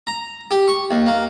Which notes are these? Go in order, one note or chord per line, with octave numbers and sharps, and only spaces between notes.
A#5
G4
C#6
D#2
A#3